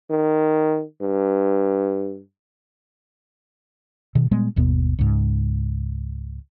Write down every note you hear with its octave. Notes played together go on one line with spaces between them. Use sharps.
D#3
G2
B2 D#3
A#2 G3 G#3 B3
G1 D#2 B2 B3
C#2 G#2